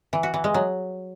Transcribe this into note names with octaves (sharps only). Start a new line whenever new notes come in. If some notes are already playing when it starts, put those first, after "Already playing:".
E3
F#4
E3
G#3
F#3